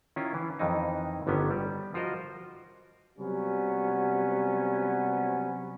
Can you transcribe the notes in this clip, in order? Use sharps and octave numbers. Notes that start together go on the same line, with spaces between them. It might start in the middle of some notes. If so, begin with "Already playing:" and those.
D#3 C#4 E4 F4
E3
F2 D#3 E3 D#4
G1 D3 D#3 B3 C#4
G3
F3 F4 F#4 A#4 C5 D#5
C3 F#3 G3 B3 C#4